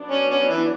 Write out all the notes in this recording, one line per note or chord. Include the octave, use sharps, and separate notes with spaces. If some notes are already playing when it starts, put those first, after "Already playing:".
Already playing: F#3 B3 D4
C#4
C#4
E3